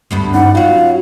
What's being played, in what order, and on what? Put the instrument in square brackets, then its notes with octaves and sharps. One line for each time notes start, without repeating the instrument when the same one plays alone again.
[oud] D2 G2 B3
[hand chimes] C#4 D#4 [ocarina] F#5
[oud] F#3 F#4 [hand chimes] F4 [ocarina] F5